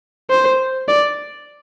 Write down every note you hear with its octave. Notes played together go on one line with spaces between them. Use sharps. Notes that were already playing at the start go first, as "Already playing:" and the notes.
C5
D5